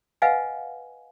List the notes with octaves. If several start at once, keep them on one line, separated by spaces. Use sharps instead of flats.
B4 D#5 F5 F#5 G#5